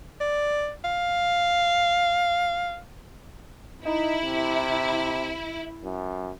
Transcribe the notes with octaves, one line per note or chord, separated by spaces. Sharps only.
D5
F5
D#4 E4
C3
F#2